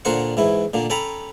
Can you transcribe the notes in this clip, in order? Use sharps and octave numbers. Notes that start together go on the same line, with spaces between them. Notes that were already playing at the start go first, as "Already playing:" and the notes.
A#2 D3 A#4 C5 F#5 C#6
G#2 E3 E4
A#2 D3 A#3
C#4 A4 G5 G#5 A#5 B5